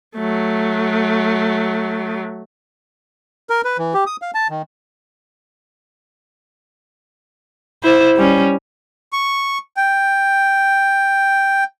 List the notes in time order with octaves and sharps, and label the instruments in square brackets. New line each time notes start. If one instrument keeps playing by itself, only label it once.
[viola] F#3 A3
[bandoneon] A#4
B4
E3
G4
D#6
F5
A5
D#3
[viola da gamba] E4 C5
G3 C#4
[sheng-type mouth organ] C#6
G5